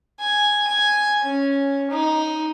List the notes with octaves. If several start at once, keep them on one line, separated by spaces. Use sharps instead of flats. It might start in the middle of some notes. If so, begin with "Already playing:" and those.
G#5
G#5
C#4
D#4